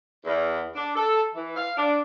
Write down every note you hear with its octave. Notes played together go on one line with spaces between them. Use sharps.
E2
D4
A4
E3
F5
D4